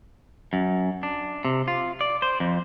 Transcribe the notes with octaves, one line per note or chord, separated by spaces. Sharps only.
F#2
D4
C3
F4
D5
C5
F2